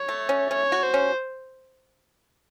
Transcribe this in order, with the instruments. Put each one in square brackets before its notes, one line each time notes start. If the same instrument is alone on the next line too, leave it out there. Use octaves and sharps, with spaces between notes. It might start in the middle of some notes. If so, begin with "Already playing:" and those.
Already playing: [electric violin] C#5
[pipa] A3
C#4
[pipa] C#4 [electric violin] C#5
[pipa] F#4
[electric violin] C5
[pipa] C#4